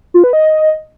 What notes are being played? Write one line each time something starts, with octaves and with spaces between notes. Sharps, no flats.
F4
B4
D#5